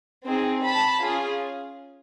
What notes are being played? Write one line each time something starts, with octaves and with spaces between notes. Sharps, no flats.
C4 D#4 G#4
A5 B5
C#4 F4 G#4